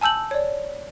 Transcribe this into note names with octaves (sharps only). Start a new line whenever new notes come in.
G#5 A5 E6 G6 F#7
C#5 D5